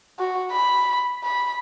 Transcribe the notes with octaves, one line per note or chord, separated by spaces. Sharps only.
F#4
B5
B5